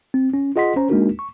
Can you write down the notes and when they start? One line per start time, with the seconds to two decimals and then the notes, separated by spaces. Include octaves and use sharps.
0.14 C4
0.34 C#4
0.56 F4 G#4 D#5 F#5 C6 B6
0.76 C#4 C5 A#5
0.90 G#3 A#3 D4 D#4 F#4 A#4
1.19 C#6